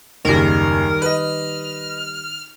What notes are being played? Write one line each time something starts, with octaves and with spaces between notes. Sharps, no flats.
F#1 D#2 D#3 G3 A#4
B4 D#5 F6